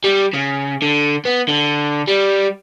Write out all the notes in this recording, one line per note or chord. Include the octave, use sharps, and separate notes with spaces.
G3
C#3
D3
B3
D3
G3